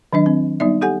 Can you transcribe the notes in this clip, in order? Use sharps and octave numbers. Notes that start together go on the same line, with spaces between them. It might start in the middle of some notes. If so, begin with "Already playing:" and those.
D#3 F#3 D4 D#5
C4
G3 B3 D#4 D5 E5
G4 A4 F#5 G#5